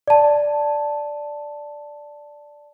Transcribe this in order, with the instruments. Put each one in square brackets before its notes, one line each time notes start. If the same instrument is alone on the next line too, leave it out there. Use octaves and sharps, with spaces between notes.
[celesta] D5 A5